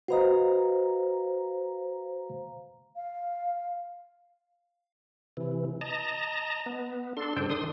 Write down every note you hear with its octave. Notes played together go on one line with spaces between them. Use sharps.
F#4 B4 C5 D#5 F5 A#5
F5
C3 E3
D#5 A5 A#5
B3
D4 A4 C6
G2 C#3 D4 A4 C5 G5
D#3 D4 C6 D#6